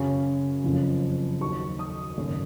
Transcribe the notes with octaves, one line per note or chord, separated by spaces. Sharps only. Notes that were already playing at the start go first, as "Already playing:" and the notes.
Already playing: F#2 C#3 F#3 C#4
F#1 F2 C#3 F3
D#2 D#3 F#3 C#6
D#6
G#1 F#2 C#3